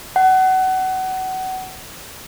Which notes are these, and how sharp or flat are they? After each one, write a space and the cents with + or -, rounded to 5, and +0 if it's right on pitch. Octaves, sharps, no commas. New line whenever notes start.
F#5 +25